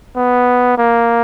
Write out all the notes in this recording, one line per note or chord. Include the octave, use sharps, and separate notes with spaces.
B3
A#3